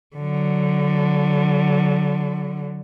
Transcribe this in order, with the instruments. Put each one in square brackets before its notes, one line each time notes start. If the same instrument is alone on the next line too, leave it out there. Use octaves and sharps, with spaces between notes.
[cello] D3 F#3